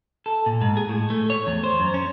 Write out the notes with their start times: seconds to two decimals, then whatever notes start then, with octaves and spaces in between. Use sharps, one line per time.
0.26 A4
0.46 A#2
0.61 G#2
0.77 G#4
0.89 A2
1.10 A3
1.30 C#5
1.47 E2
1.64 C5
1.80 F#2
1.94 C#4